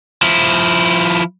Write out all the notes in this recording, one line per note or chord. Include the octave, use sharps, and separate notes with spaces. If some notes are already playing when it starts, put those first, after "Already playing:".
F3 E4